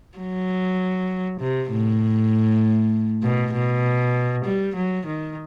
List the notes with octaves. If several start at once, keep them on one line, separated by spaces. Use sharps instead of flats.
F#3
C3
A2
B2
B2
G3
F#3
D#3